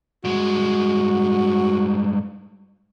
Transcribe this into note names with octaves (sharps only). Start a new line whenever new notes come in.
G2 G#3 F#4